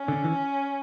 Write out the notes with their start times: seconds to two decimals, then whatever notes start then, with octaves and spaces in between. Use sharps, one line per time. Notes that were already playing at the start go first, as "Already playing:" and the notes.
Already playing: C#4
0.08 D3
0.24 E3